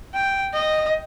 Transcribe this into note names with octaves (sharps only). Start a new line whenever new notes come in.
G5
D#5